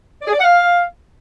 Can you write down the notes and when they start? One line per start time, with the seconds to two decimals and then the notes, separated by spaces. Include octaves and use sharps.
0.22 D5
0.27 G#4
0.33 D5
0.38 F#5
0.44 F5